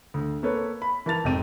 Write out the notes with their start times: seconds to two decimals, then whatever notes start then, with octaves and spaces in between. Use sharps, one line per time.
0.14 D2
0.43 A#3 A4 B4 C#5
0.82 B5
1.06 E3 A#4 A5 A6 F7
1.24 F1 F2 G#2 C4 D#7